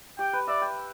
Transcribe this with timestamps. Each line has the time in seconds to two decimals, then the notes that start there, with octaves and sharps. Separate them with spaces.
0.19 G4 G5
0.33 B4
0.48 D5 E5
0.62 G5